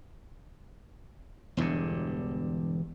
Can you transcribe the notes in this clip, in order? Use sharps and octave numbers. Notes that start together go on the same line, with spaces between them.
E1 E2 G2 D3